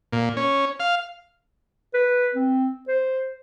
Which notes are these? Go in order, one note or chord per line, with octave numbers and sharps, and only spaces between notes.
A#2
C#4
F5
B4
C4
C5